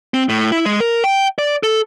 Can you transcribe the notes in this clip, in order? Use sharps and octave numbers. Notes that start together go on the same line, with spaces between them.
C4
A2
E4
G#3
A#4
G5
D5
A4